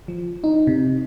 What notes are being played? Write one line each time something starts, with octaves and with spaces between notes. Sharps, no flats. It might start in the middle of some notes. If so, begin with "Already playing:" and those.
F3
D#4
C3